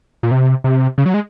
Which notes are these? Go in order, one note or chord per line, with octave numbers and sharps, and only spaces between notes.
A#2
C3
C3
C#3
F#3
G#3